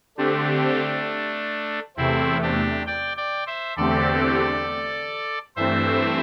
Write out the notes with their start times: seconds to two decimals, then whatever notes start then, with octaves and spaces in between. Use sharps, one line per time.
0.17 D3 A3 C4 D4 G4
1.97 E2 C3 A3 C4 E4
2.42 D4 G4
2.87 D5 G5
3.17 D5 G5
3.47 C5 E5
3.76 E2 D3 A3 C4 G4 A4 D5
5.56 G2 E3 A3 C4 C5 E5